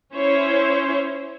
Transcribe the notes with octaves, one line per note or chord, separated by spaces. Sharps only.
C#4 E4 C5 C#5